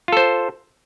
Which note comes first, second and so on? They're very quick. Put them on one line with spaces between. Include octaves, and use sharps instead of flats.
F4 A4 C5